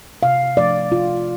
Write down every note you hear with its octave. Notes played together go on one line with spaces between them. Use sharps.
C3 F5
F3 A3 D5
C3 F4